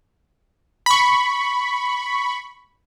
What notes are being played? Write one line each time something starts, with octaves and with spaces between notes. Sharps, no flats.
B5 C#6